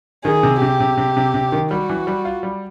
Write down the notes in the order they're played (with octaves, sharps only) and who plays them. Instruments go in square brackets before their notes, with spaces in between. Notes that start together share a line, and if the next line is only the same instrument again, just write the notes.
[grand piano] D#3 [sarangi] G#4
[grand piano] C3
[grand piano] C3 [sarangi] G4
[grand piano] C3
C3
C3
C3
D#3
[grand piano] G3 [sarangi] F#4
[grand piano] E3
G3
F4
G3